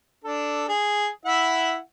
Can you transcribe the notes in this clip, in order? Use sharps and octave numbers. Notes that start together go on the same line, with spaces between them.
D4 A4
G#4
E4 E5 F#5